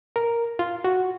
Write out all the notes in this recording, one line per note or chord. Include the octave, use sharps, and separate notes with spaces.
A#4
F4
F#4